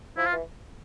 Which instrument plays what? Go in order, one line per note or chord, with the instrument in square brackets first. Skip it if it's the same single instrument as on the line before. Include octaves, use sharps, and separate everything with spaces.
[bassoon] F3 [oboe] E4
[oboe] F4
[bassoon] E3